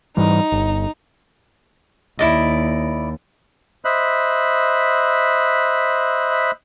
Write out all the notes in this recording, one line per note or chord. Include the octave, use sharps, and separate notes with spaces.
G#2 E3 G3 D#4
G1
D#2 E4 D5 D#5
C5 D#5 E5 B5 F#6